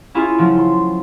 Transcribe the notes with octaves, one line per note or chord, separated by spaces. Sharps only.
C#4 E4 F4 G#4
C#3 F3 F#3 A3
C6